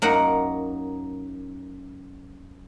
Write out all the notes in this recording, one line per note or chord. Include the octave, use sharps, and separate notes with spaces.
F#2 A#3 D#4 F#5